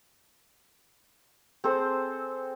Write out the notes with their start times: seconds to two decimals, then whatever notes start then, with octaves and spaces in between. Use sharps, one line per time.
1.64 C4 G#4 A4 C5